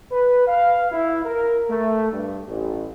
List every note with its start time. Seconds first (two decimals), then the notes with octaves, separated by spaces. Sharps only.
0.11 B4
0.48 F5
0.92 E4
1.25 A#4
1.69 A3
2.12 G2
2.47 A1